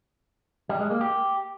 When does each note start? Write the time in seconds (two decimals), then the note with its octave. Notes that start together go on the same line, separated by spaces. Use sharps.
0.69 G3
0.80 G#3
0.90 A#3
1.01 G4